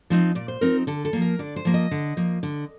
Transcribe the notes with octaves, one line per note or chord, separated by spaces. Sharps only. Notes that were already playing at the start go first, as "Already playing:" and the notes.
F3 C4 D#4
A#2 D5
C5
F3 C4 D#4 A#4
D3 A4
A4
F3 A#3
A#4
D3 D5
C5
F3 A#3
D#5
D3
F3 A#3
D3